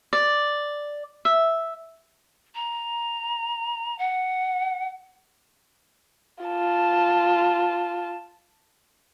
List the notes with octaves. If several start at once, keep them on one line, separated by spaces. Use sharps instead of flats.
D5
E5
A#5
F#5
F4 A5